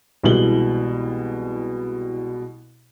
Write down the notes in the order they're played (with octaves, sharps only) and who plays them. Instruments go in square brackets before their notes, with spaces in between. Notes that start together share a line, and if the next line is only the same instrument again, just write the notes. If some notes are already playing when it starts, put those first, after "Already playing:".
[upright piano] C2 B2 E3 G#3 F#7 G7